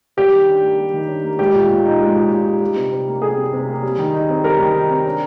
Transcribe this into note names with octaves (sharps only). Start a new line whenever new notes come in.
G3 G4
D#3
D4
A#3
G3
D#3
D4
A#3
G#3 G4
A#2
A#2
D#4
G#3
A#2
A#2
D#4
G3
C3
C3
A#3
G3 G#4
C3
C3
A#3
G3
D#3
D#4
C4
G3 A#4
D#3
D#4
C4
D4